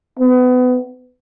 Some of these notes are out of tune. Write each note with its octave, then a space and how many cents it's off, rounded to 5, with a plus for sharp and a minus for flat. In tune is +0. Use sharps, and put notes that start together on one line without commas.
B3 +30